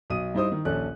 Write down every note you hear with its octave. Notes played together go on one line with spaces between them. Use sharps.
B1 D#6 D#7
G2 D#4 E4 C5 D#6
D#3
A#1 D#2 C#4 A4 F#6